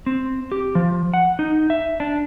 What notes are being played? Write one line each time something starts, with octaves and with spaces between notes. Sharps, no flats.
C4
G4
F3
F#5
D#4
E5
D4